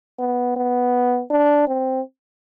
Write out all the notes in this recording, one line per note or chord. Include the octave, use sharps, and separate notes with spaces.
B3
B3
D4
C4